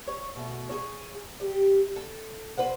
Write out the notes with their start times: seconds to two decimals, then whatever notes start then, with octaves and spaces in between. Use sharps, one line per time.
0.08 C#5
0.36 B2 A3
0.69 G#4 A4 C#5
1.40 G4
1.96 A4
2.57 B4 C5 F#5